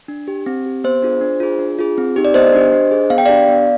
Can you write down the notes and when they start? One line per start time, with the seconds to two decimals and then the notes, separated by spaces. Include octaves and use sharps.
0.08 D4
0.28 G4
0.46 C4
0.66 G4
0.84 B3 C5
1.02 D4 F4 G#4
1.21 D4
1.40 F4 G#4
1.59 D4
1.79 F4 G#4
1.98 C4
2.16 D#4 G4
2.25 D5
2.34 B3 C5 D#5
2.53 D4 G4
2.73 D4
2.91 G#4
3.10 B3 F5
3.18 G5
3.25 D4 G4 D5 F5
3.49 B3